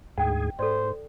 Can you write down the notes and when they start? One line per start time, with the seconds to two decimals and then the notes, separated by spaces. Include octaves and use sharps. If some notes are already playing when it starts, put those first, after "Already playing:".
0.18 D2 G#2 G#4 F#5 G5
0.59 G#2 A4 C5 D5